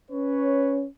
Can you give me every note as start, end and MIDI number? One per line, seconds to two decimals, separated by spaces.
0.10 0.86 61
0.10 0.86 71
0.10 0.86 73